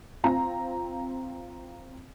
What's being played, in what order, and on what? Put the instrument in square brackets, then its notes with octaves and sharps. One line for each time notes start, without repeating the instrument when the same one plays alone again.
[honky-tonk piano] C4 F4 A#5